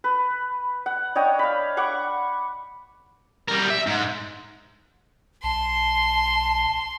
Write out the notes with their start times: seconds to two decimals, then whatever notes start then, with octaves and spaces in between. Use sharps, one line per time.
0.04 B4
0.86 F#5
1.15 D4 C#5 D#5 G5
1.39 F5 B5
1.77 F#5 C#6 D6
3.48 G3 A#4
3.70 E5
3.87 G#2
5.43 B1 A5 C6